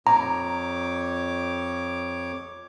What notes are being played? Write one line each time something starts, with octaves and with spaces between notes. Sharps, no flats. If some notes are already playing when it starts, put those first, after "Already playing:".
F2 C#5 A#5 D6